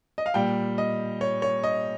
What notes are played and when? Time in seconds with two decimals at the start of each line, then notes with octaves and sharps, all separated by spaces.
0.18 D#5
0.26 F5
0.34 A#2 G3 G5
0.78 D#5
1.21 C#5
1.42 C#5
1.64 D#5